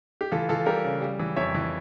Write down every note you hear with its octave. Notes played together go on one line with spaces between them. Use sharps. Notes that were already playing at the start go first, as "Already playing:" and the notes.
G4
E3 F4 A4
E3 F4 A4
G3 G4 A#4
C#3
G3
E3
F2 C#5 E5
E3